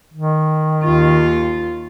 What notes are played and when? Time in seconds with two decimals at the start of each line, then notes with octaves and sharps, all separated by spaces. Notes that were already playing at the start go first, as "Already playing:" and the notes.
0.14 D#3
0.84 D#2 F4